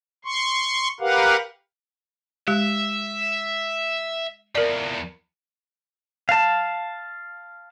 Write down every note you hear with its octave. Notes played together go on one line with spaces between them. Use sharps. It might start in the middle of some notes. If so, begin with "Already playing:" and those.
C6 C#6
G4 A#4 B4 F5 F#5
G#3 G4 E5
E2 F3 A#4 D5
F5 A5